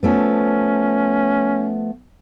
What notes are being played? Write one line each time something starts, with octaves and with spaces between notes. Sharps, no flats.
F3 A3 B3 C#4